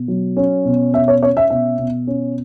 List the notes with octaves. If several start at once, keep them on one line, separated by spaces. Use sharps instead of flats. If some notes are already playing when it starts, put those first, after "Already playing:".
Already playing: B2
F#3
C#4
B2
C#4 E5
C#5
C#4 C#5
E5
B2 E5
B2
C#4